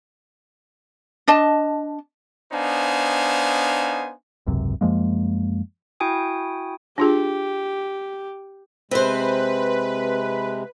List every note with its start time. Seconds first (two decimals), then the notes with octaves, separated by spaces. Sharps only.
1.28 D4 D#5 A5
2.52 B3 D4 D#4 C5 F5 G#5
4.47 G#1 C#2 F#2 C3
4.81 F#2 F3 G#3 A#3
6.00 E4 F#4 G5 G#5 D#6
6.98 D4 F4 G4 G#4
8.91 C3 G#3 C4 B4 C5